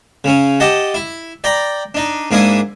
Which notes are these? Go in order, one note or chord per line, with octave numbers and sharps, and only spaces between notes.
C#3 C#4
G4 D#5 F#5 A5
E4
D5 G5 A#5 B5
D4 D#4
G#2 A#3 D4 E4 G#5 D#6